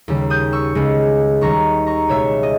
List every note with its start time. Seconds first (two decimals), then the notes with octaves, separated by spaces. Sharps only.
0.08 D#2 C#3 G3
0.30 D#6 G6
0.53 C#6 E6
0.75 C#2 C#3 G#3
1.41 D#2 D#3 G3 A#5 C#6
1.86 A#5 C#6
2.08 C#2 B2 G#3 C#5 E5
2.43 D#5